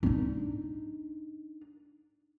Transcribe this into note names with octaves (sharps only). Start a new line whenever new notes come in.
D4 D#4